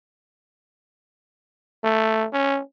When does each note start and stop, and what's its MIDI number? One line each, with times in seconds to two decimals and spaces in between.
1.84 2.26 57
2.33 2.60 61